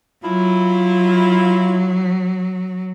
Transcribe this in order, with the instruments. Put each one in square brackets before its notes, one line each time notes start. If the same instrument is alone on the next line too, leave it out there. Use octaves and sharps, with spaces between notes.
[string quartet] F#3 [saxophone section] E4 F4